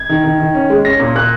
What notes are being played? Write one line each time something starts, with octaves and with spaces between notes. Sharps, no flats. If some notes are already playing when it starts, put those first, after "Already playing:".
Already playing: G#6
D#3
D#3
D#3
C#4
G#3
C#4 A#6
A#2
A#2 F#6